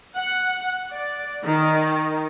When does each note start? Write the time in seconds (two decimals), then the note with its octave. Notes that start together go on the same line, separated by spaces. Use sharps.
0.16 F#5
0.93 D5
1.44 D#3